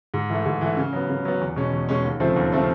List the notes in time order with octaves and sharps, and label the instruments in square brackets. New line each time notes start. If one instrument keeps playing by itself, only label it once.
[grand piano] G#2
E3 A3
G#2
E3 A3
C#3
F#3 B3
C#3
F#3 B3
E2
B2 G#3 C#4
E2
B2 G#3 C#4
D#2
C#3 F3 A3 C4
D#2
C#3 F3 A3 C4